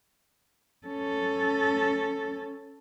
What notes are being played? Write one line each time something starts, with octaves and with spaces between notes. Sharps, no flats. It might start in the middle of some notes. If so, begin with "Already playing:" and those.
C#4 A4